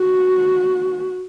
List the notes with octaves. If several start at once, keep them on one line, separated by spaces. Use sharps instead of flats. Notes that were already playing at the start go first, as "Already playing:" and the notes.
Already playing: F#4